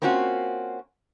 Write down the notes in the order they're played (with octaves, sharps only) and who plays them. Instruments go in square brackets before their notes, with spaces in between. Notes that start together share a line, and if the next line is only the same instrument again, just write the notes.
[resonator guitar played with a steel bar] A#3 C4 C#4 F4 F#4